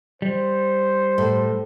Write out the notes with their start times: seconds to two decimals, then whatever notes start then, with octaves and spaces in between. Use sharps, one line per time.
0.22 G3 C5
1.18 A2